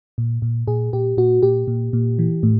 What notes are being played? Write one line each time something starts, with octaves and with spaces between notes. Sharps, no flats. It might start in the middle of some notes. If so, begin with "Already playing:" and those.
A#2
A#2
A#2 G#4
A#2 G4
A#2 F#4
A#2 G4
A#2
A#2
E3
A2